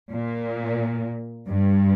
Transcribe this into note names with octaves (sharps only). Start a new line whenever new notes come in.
A#2
G2